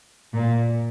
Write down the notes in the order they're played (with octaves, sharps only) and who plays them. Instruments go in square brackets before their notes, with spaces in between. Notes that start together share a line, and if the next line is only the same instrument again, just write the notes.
[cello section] A#2